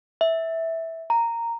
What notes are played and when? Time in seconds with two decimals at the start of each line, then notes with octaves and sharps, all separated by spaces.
0.21 E5
1.10 A#5